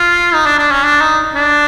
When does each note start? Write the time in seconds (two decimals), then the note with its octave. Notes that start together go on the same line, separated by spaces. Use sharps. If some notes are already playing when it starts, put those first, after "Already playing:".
Already playing: F4
0.34 D#4
0.46 D4
0.59 D4
0.71 C#4
0.84 D4
1.01 D#4
1.35 D4